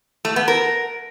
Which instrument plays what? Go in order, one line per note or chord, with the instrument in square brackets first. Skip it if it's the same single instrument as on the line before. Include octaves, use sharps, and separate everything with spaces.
[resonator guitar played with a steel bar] A3
B3
A#4